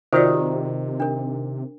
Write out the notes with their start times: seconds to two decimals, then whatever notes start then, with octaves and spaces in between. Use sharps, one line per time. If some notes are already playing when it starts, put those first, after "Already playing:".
0.13 C3 D#3 F4 F#4 C5 D5 E5
1.00 D4 A#4